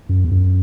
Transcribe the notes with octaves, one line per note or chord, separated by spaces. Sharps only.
F#2
E2
F#2